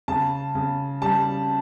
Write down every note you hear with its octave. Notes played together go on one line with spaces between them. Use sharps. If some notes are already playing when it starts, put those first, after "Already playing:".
C#3 A5
C#3
G3 A5